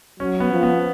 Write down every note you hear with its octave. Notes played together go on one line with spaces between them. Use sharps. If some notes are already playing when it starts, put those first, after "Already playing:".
F#3 C#4
B3
F3
B3